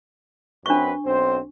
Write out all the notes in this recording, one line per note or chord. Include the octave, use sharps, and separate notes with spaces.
F#2 C4 D4 B4 C#6
B1 C4 C5